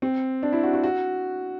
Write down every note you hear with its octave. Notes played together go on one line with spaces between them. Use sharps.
C4
D4
E4
F#4
F#4
F#4